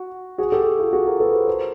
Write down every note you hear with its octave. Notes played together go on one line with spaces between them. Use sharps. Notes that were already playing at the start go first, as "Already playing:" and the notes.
Already playing: F#4
F#4 G#4
G4 A4
F4 G4
F#4 G#4
G#4 A#4
A4 B4
A#4 C5
A#4 C5